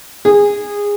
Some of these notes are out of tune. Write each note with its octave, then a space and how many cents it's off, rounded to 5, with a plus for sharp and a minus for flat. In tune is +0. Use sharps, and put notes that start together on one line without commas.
G#4 -20